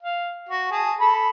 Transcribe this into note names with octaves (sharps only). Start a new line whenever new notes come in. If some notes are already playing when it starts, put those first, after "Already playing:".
F5
F#4
G#4 A5
A4 B5